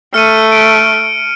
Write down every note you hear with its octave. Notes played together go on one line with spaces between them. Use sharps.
A3 F6 C#7 D#7
D7